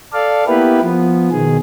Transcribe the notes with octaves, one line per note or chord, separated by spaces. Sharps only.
A4 D5 F5
A#3 B3 E4 G4 B4
F3 B3
B2 D#3 G#4